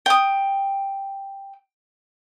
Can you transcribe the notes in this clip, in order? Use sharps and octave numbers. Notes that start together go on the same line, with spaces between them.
G5 D#6